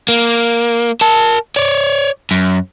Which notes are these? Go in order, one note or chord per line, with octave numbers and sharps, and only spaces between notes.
A#3
A#4 A5
C#5 D5
F#2